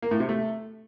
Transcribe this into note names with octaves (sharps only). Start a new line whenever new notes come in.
A#3
A2
C3
A3